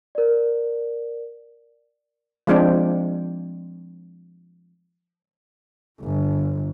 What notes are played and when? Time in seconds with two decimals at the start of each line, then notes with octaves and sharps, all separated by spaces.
0.15 A#4 D5
2.47 F3 G#3 C4 D4
6.02 G1